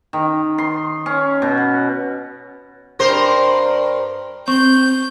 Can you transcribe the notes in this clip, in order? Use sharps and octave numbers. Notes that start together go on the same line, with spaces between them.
D#3
C6
C#4
B2
F#5
G2 A#4 C5
C4 C#6 G6